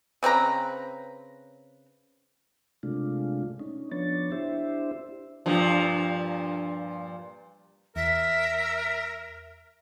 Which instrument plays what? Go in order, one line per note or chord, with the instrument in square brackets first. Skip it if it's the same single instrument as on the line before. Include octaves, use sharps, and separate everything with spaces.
[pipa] C#3 C4 B4 A#5
[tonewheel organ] C3 G#3 A3 D4 F4
C#4 D#4
F3 B3 D4 C#5 A6
D4 E4 G4 C5 E5
[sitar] G2 A#2 F3
[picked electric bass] E2 [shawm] A#4 [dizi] E5